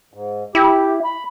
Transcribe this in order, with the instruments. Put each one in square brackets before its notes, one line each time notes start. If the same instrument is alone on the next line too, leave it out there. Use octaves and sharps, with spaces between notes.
[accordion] G#2
[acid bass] E4 [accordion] G4
[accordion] B5